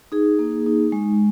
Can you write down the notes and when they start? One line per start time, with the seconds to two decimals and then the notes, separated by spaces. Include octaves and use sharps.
0.12 D#4 G#4
0.39 A#3
0.66 D#4
0.92 G#3